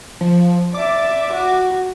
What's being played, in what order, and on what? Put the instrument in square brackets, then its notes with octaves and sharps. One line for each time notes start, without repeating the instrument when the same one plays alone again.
[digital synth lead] F3
[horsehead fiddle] D5 E5 [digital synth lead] D6
[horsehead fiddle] F#4